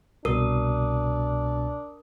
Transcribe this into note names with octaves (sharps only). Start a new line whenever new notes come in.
C2 B2 D4 A#4 D#6